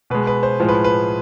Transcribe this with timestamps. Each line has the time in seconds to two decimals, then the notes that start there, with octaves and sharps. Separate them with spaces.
0.10 B2 G#3 B4
0.27 B4
0.43 C5
0.60 A2 F3 G#3 C5
0.68 B4
0.84 B4